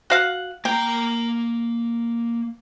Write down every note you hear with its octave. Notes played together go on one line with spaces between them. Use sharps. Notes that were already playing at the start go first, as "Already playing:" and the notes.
F#4 F5 F#5
A#3 G5 A#5